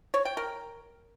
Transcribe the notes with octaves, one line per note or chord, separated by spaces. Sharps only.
C#5
G5
A#4